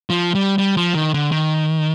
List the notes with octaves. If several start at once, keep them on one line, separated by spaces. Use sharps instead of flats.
F3
G3
G3
F3
D#3
D3
D#3